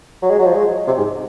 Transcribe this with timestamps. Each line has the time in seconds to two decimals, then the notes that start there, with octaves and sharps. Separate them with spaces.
0.22 F#3
0.30 G#3
0.39 F#3
0.46 F3
0.55 G#3
0.87 C3
0.97 G#2